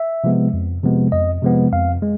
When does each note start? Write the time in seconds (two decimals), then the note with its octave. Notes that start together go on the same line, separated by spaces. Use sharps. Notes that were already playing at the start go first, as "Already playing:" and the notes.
Already playing: E5
0.24 C3 F3 G#3 B3
0.53 F2
0.83 C3 F3 G#3 B3
1.12 F2 D#5
1.42 C3 F3 G#3 B3
1.72 F2 F5
2.02 G#3